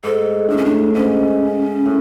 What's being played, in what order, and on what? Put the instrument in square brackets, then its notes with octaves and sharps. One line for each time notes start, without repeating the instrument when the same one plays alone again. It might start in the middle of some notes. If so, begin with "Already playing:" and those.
[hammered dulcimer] G#2 [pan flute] A4
[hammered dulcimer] A2 [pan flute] D4
[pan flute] C#4
D4
[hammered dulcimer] G#2 [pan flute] C#4
[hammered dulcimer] A2